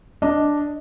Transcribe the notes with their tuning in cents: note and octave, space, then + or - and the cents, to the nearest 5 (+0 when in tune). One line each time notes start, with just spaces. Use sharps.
D4 +0 D#5 +0